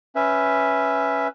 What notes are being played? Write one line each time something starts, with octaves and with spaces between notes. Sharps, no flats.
C#4 B4 E5